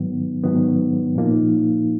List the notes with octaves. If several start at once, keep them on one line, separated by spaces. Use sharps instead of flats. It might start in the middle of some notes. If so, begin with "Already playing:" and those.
Already playing: G#2 D#3 F#3 B3
G#2 D#3 F#3 B3
A#2 F3 A#3 D#4